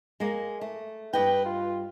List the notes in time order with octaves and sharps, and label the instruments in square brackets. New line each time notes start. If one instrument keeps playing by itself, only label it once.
[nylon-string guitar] G#3 A#3
A3
[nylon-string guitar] G2 D#5 G5 [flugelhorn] B4
[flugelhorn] F4